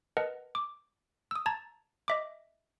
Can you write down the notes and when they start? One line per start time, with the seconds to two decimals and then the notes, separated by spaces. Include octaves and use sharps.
0.17 A#4 B4 D#5 F#5 A5
0.55 D6
1.31 D#6 E6
1.46 A5 A#5 G#6 A6
2.08 D#5 E5 D6